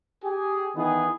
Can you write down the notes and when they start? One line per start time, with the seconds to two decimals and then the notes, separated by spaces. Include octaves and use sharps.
0.24 G4 G#4
0.76 D#3 E3 B3 G#4